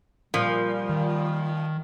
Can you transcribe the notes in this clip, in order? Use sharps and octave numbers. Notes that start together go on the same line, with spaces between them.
A#2 F3 G3
D#3